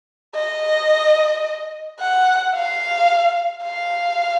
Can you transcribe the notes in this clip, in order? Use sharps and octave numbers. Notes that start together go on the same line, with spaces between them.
D#5
F#5
F5
F5